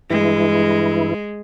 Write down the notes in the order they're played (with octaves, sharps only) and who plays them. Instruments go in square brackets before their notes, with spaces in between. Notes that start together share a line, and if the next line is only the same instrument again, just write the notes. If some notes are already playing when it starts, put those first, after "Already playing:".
[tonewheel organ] G2 E3 E4 [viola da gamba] G#3